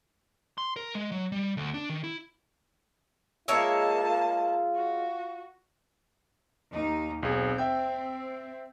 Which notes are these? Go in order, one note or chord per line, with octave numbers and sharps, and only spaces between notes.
C6
A#4
G#3
F#3
G3
D2
D4
D#3
E4
G#3 A#3 F4 C#5 E5 A5
F4
F#4
D#2 D#4
B1 C4 G#4
E5 G5 G6